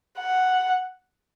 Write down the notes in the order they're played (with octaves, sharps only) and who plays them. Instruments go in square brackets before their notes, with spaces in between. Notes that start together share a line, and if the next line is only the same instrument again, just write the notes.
[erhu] F#5